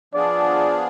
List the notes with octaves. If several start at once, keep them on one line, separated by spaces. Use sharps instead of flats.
F3 B3 D4 F4 G#4 D5